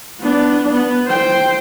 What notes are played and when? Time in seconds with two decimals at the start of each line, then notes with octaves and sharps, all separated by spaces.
0.20 B3 D4
0.71 B3
1.07 C5 G5